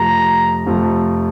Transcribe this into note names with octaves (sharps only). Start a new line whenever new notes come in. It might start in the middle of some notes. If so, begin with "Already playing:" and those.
Already playing: F2 C3 F3 A3 A#5
F2 C3 F3 A3